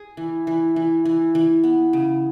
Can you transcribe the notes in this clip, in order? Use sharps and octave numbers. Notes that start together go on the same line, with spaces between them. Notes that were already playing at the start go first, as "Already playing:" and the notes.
Already playing: G#4
E3
E3
E3
E3
E3
B3
C#3